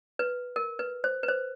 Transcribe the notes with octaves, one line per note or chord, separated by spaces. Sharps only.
B4
A#4
B4
C5
B4
C5